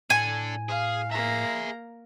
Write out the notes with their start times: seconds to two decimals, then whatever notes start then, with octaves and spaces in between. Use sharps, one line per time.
0.10 A2 D4 A4 G#5
0.69 G#4 F5
1.12 A#3 G#4 E5 A#5